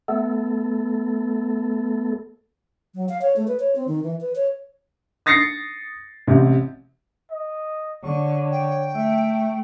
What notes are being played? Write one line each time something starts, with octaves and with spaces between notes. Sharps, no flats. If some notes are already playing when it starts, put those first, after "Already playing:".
A3 B3 A4
F#3
F5
C#5
A3
B4
C#5
C4
D#3
E3
B4
C#5
D#6 A6 A#6 C7 C#7
A1 C3
D#5
D3 C#5 C#6
G5
A3 E5